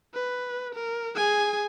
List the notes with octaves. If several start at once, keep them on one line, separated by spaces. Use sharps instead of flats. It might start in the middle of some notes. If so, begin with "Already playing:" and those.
B4
A#4
G#4 G#5